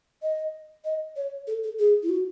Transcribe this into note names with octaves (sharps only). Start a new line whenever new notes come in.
D#5
D#5
C#5
A4
A4
G#4
E4
F#4